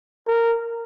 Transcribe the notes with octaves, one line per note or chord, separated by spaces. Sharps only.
A#4